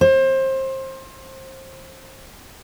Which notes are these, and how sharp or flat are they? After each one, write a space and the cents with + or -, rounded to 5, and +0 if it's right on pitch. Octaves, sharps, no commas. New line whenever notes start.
C5 +25